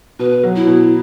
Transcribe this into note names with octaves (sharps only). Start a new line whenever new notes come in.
B2 B4
F#3
E4
B2